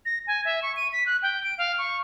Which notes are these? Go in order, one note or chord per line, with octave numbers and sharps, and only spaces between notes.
A#6
G#5
E5
C#6
D#7
B6
F#6
G5
D7
F5
C#6